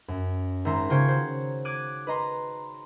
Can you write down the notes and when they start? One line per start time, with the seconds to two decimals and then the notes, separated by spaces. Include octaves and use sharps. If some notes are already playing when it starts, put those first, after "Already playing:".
0.08 F#2
0.65 G#1 E5 A#5 C6 C7
0.90 C#3 F4 C5 G5 C#6 G#6
1.07 F#4 C5 C#5
1.65 D6 F#6 G#6 D7 D#7
2.07 B4 D#5 A#5 C6